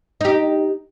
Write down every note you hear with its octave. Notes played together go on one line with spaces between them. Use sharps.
D#4 G4